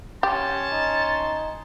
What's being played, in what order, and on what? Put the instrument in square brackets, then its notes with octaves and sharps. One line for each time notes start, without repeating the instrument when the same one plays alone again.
[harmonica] C#4 C6 [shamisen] G4 [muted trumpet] A5
[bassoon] D#4